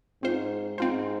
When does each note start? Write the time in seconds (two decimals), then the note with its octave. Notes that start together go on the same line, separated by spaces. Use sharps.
0.22 G#2 C4 F4 C5
0.78 G#2 C4 F4 C5